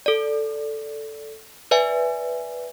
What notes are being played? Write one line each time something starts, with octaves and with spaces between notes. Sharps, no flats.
A4 D5
B4 D5 E5 G#5